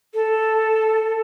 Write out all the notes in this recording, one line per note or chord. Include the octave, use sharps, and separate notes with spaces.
A4